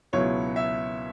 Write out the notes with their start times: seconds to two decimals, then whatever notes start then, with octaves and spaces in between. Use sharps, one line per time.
0.13 C#2 B2 F#3 B3 E4 C#5
0.56 E5